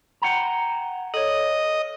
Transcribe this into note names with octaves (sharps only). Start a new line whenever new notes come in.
F#5 G5 A#5
A4 C#5 D#5